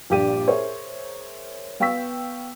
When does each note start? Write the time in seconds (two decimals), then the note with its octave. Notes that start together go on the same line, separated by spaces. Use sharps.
0.10 A#1 G2 A#2 G4 D5 D#7
0.47 G#4 A#4 C5 C#5 E5
1.80 B3 F5 G5 C#6 E6 B6